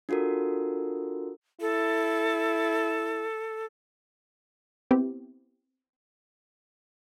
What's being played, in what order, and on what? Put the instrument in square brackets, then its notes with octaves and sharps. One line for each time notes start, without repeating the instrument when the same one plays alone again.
[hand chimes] D4 F4 F#4 A4 A#4
[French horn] E4 [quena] A4
[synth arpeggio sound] B3 C4 E4 G4